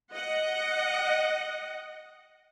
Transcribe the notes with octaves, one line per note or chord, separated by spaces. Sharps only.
D#5 F#5